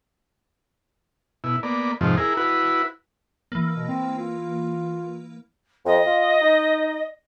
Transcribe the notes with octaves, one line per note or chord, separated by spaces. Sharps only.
B2 E4
A#3 B3 D5
F2 G#2 C3 D#3 F3
E4 G#4 A#4
E4 F#4 B4
E3 A#3
B2
C4
F4
F2 D#5
F4
D#4